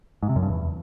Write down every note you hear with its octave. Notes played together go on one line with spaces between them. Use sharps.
G#2
C3
F#2
G2
E2